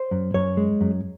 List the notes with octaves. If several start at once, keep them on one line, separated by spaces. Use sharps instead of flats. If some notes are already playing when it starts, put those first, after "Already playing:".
Already playing: C5
F#2
F#2 C#5
G#3
F#2